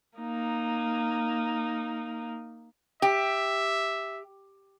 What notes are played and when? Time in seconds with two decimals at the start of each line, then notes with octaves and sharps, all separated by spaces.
0.18 A#3 D#4
3.02 G4 E5